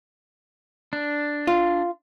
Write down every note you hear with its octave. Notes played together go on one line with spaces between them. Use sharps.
D4
F4